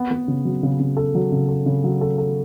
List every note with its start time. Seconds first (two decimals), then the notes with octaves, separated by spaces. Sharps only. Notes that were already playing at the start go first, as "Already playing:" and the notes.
Already playing: B3
0.11 B3
0.28 C#3
0.45 F#3
0.63 C#3
0.80 C#3
0.97 A4
1.15 F#3
1.32 C#3
1.49 A4
1.66 C#3
1.84 F#3
2.01 A4
2.18 A4